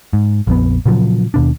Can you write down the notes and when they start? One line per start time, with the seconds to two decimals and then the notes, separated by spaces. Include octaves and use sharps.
0.13 G#2
0.47 A#1 F2 B3
0.86 A#2 C#3 F3 F#3
1.34 D#2 B2 D4